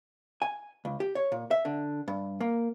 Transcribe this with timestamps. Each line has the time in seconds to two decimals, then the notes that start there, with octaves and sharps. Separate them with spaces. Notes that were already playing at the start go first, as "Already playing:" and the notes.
0.42 G#5
0.85 C#2
1.00 G4
1.15 C#5
1.32 A#2
1.51 E5
1.65 D3
2.08 G2
2.40 A#3